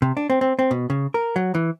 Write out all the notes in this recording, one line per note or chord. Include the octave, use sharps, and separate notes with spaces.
C3
D4
C4
C4
C4
B2
C#3
A#4
F#3
E3